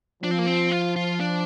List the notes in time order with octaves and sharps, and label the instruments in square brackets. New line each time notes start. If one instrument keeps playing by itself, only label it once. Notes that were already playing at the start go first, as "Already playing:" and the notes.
[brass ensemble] F3 [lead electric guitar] D4
[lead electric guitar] C4
A#3
C4
F4
F4
D4